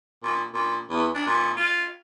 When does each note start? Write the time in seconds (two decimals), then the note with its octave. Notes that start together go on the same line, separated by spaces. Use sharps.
0.23 A#2
0.54 A#2
0.90 E2
1.15 D4
1.27 A#2
1.57 F4